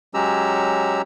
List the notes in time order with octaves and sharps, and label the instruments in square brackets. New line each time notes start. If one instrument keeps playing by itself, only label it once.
[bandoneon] F#3 G#3 C#4 G4 A#5 E6